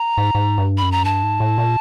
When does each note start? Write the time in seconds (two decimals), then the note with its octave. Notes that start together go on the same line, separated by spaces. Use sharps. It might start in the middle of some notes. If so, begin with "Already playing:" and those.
Already playing: A#5
0.18 G#2
0.35 G#2
0.58 G2
0.78 F#2 B5
0.92 A#5
1.05 G2 A5
1.23 G#2
1.40 A2
1.58 A#2